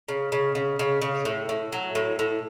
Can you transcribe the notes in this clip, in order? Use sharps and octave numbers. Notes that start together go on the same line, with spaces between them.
C#3
C#3
C#3
C#3
C#3
A2
A2
F#3
A2
A2